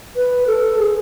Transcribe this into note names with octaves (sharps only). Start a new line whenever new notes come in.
B4
A4
G#4